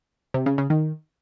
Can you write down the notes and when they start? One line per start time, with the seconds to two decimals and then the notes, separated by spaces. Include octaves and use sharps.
0.34 C3
0.46 C#3
0.58 C#3
0.70 D#3